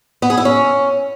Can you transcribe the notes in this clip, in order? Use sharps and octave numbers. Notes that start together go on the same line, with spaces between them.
B3
G#4
E4
C#4